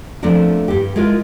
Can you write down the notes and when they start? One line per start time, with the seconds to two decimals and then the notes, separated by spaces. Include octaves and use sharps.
0.23 F3 A3 B3 C4 D4 A#4
0.68 G2 G4
0.96 G#3 E4 F4 A#4 B4